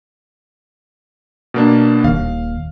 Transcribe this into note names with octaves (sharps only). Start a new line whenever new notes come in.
B2 A#3 D4
D#1 D#2 F5